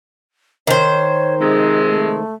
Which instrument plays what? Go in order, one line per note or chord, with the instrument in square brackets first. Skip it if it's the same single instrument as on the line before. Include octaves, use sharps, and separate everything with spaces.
[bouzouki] D#3 C5 [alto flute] C#5
[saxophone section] C3 F3 G#3 [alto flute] D#4
[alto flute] A3